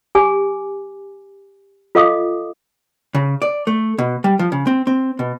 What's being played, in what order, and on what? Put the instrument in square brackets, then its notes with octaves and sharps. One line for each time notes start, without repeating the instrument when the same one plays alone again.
[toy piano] G4 G#5 D6
F4 A4 D#5 F5 D6 D#6
[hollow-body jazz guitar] C#3
D5
A3
B2
G3
F3
C#3
C4
C4
B2